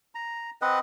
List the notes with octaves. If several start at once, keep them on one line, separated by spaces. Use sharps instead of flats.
A#5
C4 B4 D#5 F#5